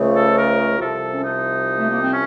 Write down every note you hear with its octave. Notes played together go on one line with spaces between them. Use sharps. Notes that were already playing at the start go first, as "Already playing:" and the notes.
Already playing: C#2 C#3 F3 A3
A4
A#4
F#4
C2 C3 F3 A4
C#4
D#4
A3
A#3
C4
C#4